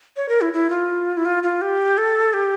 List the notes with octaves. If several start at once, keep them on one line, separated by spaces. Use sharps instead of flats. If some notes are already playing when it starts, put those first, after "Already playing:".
C#5
A#4
E4
E4
F4
E4
F4
F4
G4
A4
G4